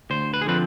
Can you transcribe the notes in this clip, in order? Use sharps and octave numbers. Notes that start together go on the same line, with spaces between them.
D2 C5
B4
G#4
D3 F3 C4 F4 B4